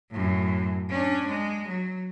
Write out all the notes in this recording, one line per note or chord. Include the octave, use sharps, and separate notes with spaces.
F#2 A2
C#4 D4
G#3
F#3